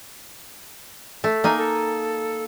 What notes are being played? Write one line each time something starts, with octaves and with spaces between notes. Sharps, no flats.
A3
A#3 D#4 G#5
A4